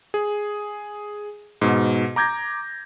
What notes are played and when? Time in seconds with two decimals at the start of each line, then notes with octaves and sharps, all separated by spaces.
0.14 G#4
1.62 G#2 B2
2.16 A#5 D6 G6 G#6 A#6